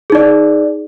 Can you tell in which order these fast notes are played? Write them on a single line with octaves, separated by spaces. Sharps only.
G#4 D#4 D5